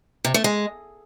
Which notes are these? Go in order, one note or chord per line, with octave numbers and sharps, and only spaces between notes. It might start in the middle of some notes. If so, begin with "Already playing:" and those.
C3
A3
G#3